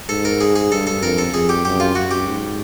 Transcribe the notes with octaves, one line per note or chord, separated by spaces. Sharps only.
G#2 A4
A#4
G#4
G#4
G2 A4
A4
F2 A#4
A4
F2 G#4
G4
F#2 G4
F4
F#2 F#4
G4
G#2